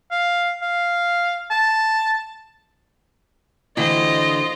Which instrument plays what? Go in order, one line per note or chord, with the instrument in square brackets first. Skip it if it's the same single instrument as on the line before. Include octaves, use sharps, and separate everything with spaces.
[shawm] F5
F5
A5
[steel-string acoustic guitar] D2 D3 G5 [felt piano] E3 [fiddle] F4 C5 [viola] D#5